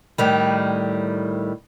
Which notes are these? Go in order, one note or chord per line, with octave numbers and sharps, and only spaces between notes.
A2 D#3 G3